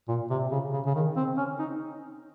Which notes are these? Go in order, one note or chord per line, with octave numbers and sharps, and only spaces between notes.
A#2
C3
C#3
C#3
C#3
D#3
C4
C#4
D#4